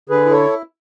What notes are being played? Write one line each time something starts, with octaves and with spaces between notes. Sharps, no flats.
D3 G#4 B4
E4
A4 C#5